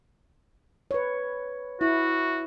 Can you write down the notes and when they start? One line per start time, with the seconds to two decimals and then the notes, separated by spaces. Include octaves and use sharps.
0.91 B4 C#5
1.81 E4 F#4